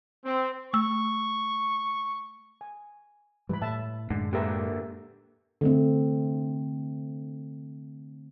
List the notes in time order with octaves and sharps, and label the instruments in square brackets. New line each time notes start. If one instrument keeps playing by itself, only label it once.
[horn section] C4
[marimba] A3 E6 [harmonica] C#6
[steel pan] G#5
[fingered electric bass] G#2 E3 G3 [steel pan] B4 B5
[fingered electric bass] A2 [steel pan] E5 A5
[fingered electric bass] F#2 A2 G#3 [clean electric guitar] D3
[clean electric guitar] D3 A#3 E5 [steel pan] G4 A#4 B4
[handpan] D3 A3 C4